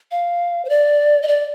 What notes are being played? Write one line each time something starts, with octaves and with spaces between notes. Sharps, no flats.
F5
C5
D5
D#5
D5